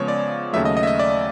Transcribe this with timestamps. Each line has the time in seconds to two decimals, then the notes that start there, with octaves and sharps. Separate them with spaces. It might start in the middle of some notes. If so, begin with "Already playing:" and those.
Already playing: C#3 F3 G#3 B3 C#5
0.08 D5
0.53 D#2 C#3 F#3 A3 E5
0.65 D#5
0.77 D#5
0.83 E5
0.87 D#5
0.99 D5